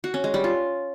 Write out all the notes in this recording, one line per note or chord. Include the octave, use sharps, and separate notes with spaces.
F#4
C#4
G#3
G3
F4